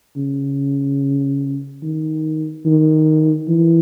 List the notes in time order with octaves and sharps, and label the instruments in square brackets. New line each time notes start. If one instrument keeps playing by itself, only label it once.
[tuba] C#3
D#3
D#3
E3